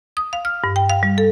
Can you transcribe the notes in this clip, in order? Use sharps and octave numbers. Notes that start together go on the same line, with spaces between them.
D#6
F5
F6
G2
G5
F5
G3
A4